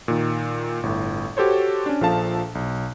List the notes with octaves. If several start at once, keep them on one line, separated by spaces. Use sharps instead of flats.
A#2 D#3
G1 A2
F#4 G4 A4 C5 C#5
C#4 D4
A#1 F3 A4 F5 A5
B1